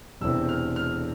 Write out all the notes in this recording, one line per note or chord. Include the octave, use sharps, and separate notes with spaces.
E1 E2 C3 E6
F6
F6